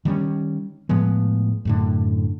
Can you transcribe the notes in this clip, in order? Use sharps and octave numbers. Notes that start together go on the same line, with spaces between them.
D#3 G3 B3 C#4
A2 F3 G#3 B3
F#2 A2 D3